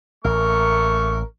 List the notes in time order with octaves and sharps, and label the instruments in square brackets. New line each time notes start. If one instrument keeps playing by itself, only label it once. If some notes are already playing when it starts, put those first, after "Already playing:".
[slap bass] A1 [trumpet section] A3 A#3 C#6 [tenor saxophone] A#4